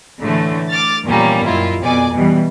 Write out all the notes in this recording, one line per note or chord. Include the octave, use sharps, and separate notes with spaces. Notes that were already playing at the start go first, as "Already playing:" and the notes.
A2 D3 E3 A3
D6 F6 A6
E2 A#2 F3 G3 A#3 C#4
F#2 A#2 D#3 E4 F4
F2 B2 D5 G#5 D6
B2 E3 G3